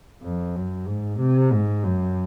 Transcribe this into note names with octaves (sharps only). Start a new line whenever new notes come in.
F2
F#2
G#2
C3
G#2
F#2